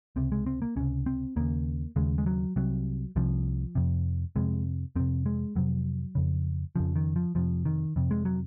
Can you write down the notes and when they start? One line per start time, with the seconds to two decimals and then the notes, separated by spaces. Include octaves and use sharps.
0.16 C#2 C3 C4
0.32 G#3
0.46 C4
0.62 A#3
0.76 C#2 C3 C#4
1.06 C4
1.36 D#2 C#3 A#3
1.96 D#2 C#3 G#3
2.18 G#3
2.26 F#3
2.56 C2 C3 F#3
3.16 C2 C3 F3
3.75 F2 C3
4.36 F2 C3 G#3
4.96 F2 C3 C4
5.26 G#3
5.55 F2 C3 F#3
6.15 F2 C#3
6.76 F2 C#3 F3
6.96 D#3
7.16 F3
7.35 F2 C3 F3
7.65 D#3
7.96 F2 C3
8.11 G#3
8.25 F#3